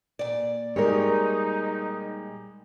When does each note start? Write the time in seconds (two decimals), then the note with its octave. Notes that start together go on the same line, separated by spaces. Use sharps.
0.19 A#2 D5
0.76 G3 G#3 D#4 A#4 C#5